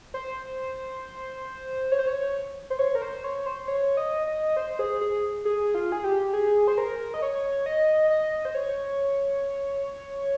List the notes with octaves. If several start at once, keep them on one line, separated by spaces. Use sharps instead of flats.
C5
C#5
C5
C#5
C5
C#5
A#4
C5
C#5
C5
C#5
D#5
D#5
C5
G#4
G#4
G#4
F4
G#4
G4
G#4
C5
A#4
D#5
C#5
D#5
D#5
C5
C#5